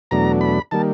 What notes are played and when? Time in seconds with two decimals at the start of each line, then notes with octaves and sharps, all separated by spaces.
0.11 E2 B2 F#3 A3 D4 A#5
0.41 B5
0.71 D#3 G3 A#3 A5